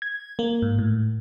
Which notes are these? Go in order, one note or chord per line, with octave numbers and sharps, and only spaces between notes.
G#6
A#3
G#2
A2